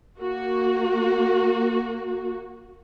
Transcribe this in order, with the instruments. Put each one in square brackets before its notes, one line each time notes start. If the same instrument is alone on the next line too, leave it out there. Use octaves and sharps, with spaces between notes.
[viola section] A#3 F#4